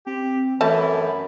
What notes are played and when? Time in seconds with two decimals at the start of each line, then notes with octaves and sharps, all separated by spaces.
0.07 C4 G4
0.61 F#2 E3 A3 A5 B5